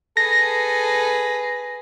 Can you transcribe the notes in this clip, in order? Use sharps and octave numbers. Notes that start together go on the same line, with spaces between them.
G#4 A4 B4 A#6